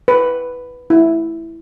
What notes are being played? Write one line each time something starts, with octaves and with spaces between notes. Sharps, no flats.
B4
E4